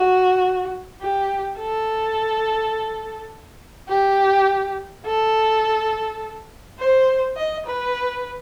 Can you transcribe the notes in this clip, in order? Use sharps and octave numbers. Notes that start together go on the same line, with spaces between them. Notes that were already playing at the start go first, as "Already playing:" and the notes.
Already playing: F#4
G4
A4
G4
A4
C5
D#5
B4